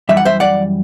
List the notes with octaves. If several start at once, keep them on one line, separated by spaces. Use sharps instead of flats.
F#2 E3 G3 E5
F#5
C5 E5
D5 F#5